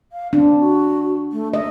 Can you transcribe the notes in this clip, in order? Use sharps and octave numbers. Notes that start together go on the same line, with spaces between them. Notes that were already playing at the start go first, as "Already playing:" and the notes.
F5
C4 D4
F#4
A3
D#5 E5